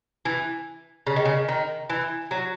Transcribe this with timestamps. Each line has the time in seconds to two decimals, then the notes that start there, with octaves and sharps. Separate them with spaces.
0.25 E3
1.07 C#3
1.16 D#3
1.25 C#3
1.49 D#3
1.90 E3
2.31 F#3